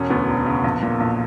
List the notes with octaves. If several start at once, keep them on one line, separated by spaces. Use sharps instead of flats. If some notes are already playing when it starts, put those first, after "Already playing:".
Already playing: E1 C#4
D2 B3
E1
C#3
A#1
A#2
A#1